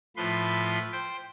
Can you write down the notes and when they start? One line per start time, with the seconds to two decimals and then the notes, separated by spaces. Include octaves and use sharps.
0.16 A2 F3 B4 C6
0.92 C5 G5